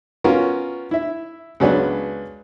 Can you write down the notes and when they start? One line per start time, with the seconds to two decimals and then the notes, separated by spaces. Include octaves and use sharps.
0.24 B3 C#4 F4 F#4 A#4
0.91 E4 E5
1.60 C#2 F#3 B3 D4 B4